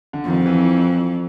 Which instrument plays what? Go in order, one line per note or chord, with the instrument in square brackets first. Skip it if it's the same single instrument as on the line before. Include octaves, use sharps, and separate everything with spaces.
[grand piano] D3
[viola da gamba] F2 [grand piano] D#3
[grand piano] E3